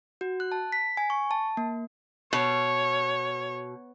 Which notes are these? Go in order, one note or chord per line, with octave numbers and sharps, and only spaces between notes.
F#4
F#6
A5
B6
G#5
C#6
A5
A#3
B2 C#5